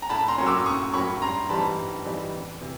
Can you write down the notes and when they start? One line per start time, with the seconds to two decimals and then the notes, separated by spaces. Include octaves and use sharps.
0.02 A#5
0.09 A2 A5 B5
0.28 A#5 C6
0.38 F#3 A#3 C#4
0.47 D6 E6
0.66 A2 C#6 D#6
0.94 F#3 A#3 C#4 B5 C#6
1.22 G2 A#5 C6
1.49 E3 G3 C4 D#4 A5 B5
1.78 G2
2.05 E3 G3 C4 D#4
2.34 E2
2.61 C3 E3